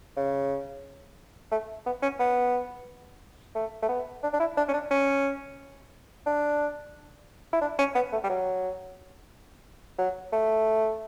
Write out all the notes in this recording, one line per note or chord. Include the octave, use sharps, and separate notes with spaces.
C#3
A3
B3
C#4
B3
A3
A3
B3
D4
D4
E4
D4
C#4
D4
C#4
D4
E4
D4
C#4
B3
A3
G3
F#3
F#3
A3